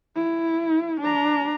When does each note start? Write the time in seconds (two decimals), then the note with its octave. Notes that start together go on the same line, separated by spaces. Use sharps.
0.16 E4
1.01 D4 A#5